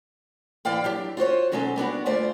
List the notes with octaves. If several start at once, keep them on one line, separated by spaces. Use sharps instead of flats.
A2 E3 D5 F5 G5
F#3 D4 G4
F4 F#4 C5 C#5
B2 F#3 G#3 C#4 D#4 A4
G3 B3 D4 F#4
D2 G#2 A3 F4 C5 D5